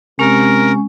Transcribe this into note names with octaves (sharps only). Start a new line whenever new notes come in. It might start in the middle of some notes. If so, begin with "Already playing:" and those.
C3 G#3 C#4 A#4